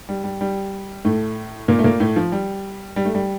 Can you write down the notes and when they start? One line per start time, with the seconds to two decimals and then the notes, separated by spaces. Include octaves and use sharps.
0.09 G3
0.24 G3
0.41 G3
1.05 A2 A3
1.68 A#2 A#3
1.79 A3
1.84 A#2 A#3
2.00 A2 A3
2.16 F3
2.32 G3
2.96 G3
3.05 A3
3.15 G3